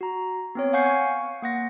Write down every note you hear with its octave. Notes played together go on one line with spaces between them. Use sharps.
F#4 A#5
B3 C4 C#5
F5 F#5 G#5 C#6 G6 C7
C#6
A#3 F#5 A#6